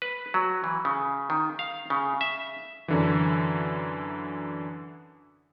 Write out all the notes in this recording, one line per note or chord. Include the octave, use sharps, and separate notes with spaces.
B4
F#3
E3
C#3
D#3
F5
C#3
E5
F#2 D3 E3